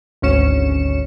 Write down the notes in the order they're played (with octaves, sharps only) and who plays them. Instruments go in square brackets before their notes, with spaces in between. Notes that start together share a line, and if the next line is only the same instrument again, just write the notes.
[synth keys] G#1 D2 C#4 C#7 E7